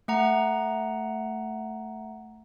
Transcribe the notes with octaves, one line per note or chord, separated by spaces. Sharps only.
A3 F#5 A#5